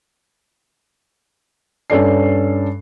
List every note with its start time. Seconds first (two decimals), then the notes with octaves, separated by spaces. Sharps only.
1.90 G2 C#4 A4 C#5 D5 C7